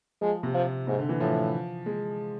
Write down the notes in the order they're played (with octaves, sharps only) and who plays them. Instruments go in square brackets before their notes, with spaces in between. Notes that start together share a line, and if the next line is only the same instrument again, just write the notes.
[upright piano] F3 [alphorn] G#3
[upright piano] C3
[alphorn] F3
[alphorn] G#2 [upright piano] C3
[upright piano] D3
E3
[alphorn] A2 [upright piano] F3
[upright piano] G#3